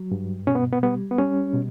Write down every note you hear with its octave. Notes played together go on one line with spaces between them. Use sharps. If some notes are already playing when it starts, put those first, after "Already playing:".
Already playing: F#3
G2
B2 C#4
B3
B3
G3 B3
B3
G3 C#4
B2